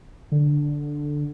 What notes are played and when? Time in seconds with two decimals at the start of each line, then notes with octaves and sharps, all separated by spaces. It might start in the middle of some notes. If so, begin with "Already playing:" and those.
0.31 D3